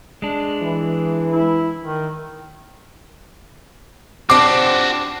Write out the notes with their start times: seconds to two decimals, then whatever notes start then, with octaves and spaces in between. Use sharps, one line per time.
0.22 G#3 D4
0.61 E3
1.31 E4
1.82 D#3
4.30 C4 D4 F#4 G4 D6